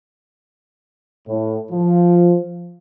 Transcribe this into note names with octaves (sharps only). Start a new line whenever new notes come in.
A2
F3